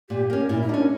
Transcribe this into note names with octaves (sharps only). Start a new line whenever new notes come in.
A#2 G4
A#3 C#4
A#2 E4
E4
A#3 C#4 D4